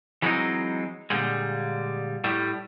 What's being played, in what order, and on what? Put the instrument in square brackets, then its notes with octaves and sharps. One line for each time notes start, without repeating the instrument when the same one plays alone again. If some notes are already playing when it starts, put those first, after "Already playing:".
[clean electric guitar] E3 F#3 G#3 A#3 C4 D#4
A#2 D3 G3 G#3
A2 G3 A3